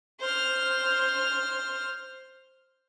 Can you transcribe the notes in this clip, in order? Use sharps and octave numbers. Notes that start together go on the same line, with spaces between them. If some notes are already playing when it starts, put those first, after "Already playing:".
C5 F6